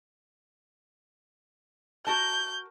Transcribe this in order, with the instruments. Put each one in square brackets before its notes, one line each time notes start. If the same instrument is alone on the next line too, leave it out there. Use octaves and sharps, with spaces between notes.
[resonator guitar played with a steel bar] F#4 A#4 A5 [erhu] G6